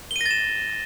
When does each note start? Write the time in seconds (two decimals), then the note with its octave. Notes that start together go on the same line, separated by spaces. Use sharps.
0.11 G7
0.16 D#7
0.21 A#6
0.26 A6
0.31 E7